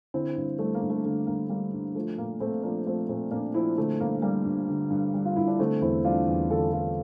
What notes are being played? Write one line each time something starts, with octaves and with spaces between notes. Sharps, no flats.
D3 C4 E4
G2
G3 A3 C4
A#3
G2
A3
D3 A3
G2 A#3
G3 A#3
G2
F3 A3
A#2 A#3
A#2 A3 C4
F3 A#3 D4
F3 A3 C4
A#2 A3 C4
A#2 A#3 D4
F3 C4 E4
D3 A3 C4
G2 A#3
G3 A#3
G2
D3
G2
G3
F4
G2 E4
D4
D3 A3 C4
E2 C4 E4
G3 D4 F4
E2
D3 F4 A4
E2 F4 A4